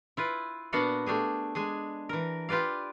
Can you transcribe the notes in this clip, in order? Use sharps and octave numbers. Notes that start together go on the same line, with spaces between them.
E4 F4 B4
A#2 B3 D4 F#4 F5 F#5
A3 D4 G4 G#4
G#3 D4 G#4
E3 A#4
F4 G4 B4 D5 F5